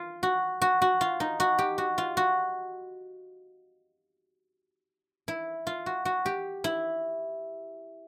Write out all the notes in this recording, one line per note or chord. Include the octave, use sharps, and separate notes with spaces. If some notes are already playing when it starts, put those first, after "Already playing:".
Already playing: F4
F#4
F#4
F#4
F4
D#4
F#4
G4
F#4
F4
F#4
E4
F4
F#4
F#4
G4
E4